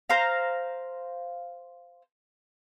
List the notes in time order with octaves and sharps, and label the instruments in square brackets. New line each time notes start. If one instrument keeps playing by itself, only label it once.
[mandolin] C5 F5 A#5